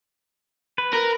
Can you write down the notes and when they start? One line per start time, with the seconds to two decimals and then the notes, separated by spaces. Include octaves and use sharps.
0.78 B4
0.93 A#4